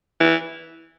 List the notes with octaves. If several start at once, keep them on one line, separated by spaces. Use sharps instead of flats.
E3